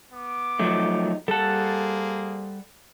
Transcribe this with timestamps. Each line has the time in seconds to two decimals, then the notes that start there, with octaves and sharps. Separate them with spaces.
0.13 B3 D6
0.59 F3 F#3 A3 D#4
1.28 G3 A#3 G#4 A4 C5 F#5 A5